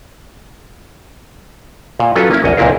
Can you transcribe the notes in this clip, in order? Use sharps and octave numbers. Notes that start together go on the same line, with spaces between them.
A#2
F#3 C#4 F4 A4 B4
A#3 C#4 E4
A#1 E2 C#5 D#5
C#2 A#2 C4 E4 A#4 F5